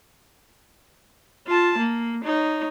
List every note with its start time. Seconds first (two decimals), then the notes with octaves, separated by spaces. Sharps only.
1.47 F4 A5
1.78 A#3
2.24 D#4 C#5